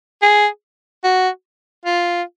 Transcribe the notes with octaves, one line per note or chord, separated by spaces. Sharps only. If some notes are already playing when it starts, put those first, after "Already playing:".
G#4
F#4
F4